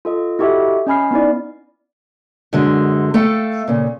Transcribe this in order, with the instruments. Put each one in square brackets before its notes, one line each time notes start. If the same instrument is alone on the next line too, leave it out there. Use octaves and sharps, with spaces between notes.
[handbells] F4 A4 D#5
E4 F#4 G4 A4 D#5 E5
C#4 D#5 G#5 B5 F6 C7
B3 D#4 E4 D5
[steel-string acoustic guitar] F#2 D3 G#3
A3 A4 F5 G5
A#2 C#3